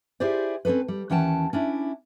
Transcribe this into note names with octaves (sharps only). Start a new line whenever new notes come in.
E4 F4 G4 G#4 C5 D5
C4 C#4 G#4 A4 B4
G3
D#2 E3 C#4 F#5 G5 A5
C#4 D4 E4